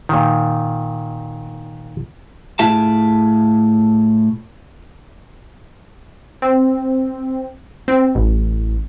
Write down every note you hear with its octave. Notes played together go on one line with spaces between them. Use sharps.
A#2 D#3
A2 F4 G#4 E5 A5
C4
C4
A1